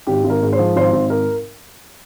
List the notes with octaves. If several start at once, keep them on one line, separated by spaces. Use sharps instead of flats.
G#1 G4
G#1
A#4
G#2
C5
F3
G#1 C5
G#1
A#4